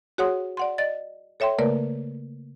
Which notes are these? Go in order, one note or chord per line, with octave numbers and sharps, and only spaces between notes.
F#4 G#4 C#5 F#5 C6 D#6
D5 F#5 C6
D5 D#5 A6
A4 C#5 E5 G5 C6
C#3 A3 A#3 A#4 B4 D5